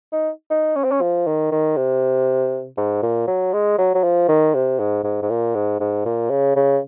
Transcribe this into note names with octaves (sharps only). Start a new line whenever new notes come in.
D#4
D#4
C#4
C4
C#4
F3
D#3
D#3
C3
G#2
A#2
F#3
G#3
F#3
F#3
F3
D#3
C3
G#2
G#2
G#2
A#2
G#2
G#2
A#2
C#3
C#3